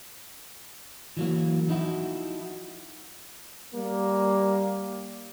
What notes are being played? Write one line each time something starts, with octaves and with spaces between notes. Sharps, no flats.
E3 F#3 A#3
F3 D#4 E4 F#4
G3 A#3